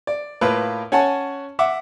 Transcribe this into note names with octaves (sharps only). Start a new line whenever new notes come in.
D5
A2 A#3 F4 B4
C#4 C#5 F#5 G#5 A5
E5 F#5 D6